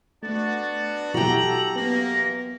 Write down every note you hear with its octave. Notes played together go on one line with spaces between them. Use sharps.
A3 B3 D4 F#4 A6
B2 F#3 E4 F#4 G4 A4 A#5 F#7
F#2 A#3 B3 A#6